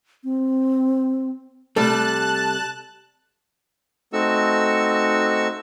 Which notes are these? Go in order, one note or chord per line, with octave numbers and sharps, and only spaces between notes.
C4
C3 G3 A3 A5 F#6
A3 C4 D#4 F#4 C#6 E6